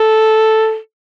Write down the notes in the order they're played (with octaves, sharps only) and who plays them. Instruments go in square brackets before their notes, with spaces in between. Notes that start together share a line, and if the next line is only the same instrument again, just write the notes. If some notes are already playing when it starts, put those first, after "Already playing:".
Already playing: [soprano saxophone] A4